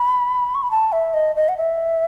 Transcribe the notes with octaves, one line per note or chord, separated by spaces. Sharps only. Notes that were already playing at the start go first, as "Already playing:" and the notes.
Already playing: B5
C#6
B5
A5
E5
D#5
D#5
F#5
E5